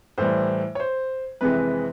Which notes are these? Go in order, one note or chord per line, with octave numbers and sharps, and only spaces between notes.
A2 E3 G3 C5
C#5
C5
F2 C3 E3 G#3 B4